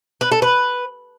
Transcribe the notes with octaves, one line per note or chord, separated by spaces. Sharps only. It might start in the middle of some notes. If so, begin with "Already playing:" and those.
B4
A4
B4